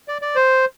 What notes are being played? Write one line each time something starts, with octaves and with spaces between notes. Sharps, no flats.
D5
D5
C5